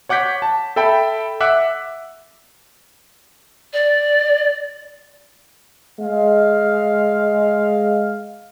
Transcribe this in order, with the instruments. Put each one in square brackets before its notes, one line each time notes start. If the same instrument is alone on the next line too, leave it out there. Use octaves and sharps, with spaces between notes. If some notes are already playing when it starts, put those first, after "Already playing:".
[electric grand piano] C#5 F#5 D6 G6 B6
A5
A4 E5 G5 B5
E5 F#5 D6 F#6
[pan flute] D5
[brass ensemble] G#3 F5